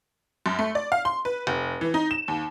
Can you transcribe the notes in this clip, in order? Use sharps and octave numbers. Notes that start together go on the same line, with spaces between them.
F#2
A3
D5
F5
C6
B4
F1
E3
D#4
E7
D#2